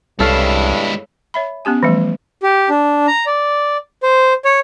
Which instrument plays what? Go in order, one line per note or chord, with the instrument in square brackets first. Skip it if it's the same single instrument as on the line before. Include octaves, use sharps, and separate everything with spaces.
[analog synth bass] C2 [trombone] G2 [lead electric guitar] G#3 E4 [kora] A4 C#5 F5
[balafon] C#5 E5 B5
B3 C#4 G4 G#5
E3 F3 G3 A3
[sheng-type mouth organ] G4
D4
A#5
D5
C5
C#5